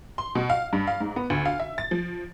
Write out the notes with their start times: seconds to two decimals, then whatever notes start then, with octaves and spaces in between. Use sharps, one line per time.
0.18 C6
0.35 B2
0.50 F5
0.73 G2
0.87 F5
1.01 G#2
1.16 B3
1.30 D2
1.45 F5
1.59 E5
1.78 A6
1.91 F3